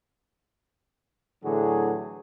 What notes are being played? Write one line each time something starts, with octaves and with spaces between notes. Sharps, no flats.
A2 D3 E3 F#3 F#4 G#4